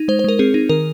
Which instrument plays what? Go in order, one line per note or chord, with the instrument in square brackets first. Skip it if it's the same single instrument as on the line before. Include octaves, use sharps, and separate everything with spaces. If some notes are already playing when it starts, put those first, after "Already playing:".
Already playing: [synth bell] D#4
G#3 C5
C5
G#3 A#4
C4 G#4
D#4
D#3 A#4